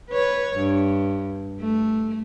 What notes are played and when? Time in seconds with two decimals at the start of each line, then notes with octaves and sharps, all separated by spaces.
0.11 B4 C#5
0.56 G2
1.60 A3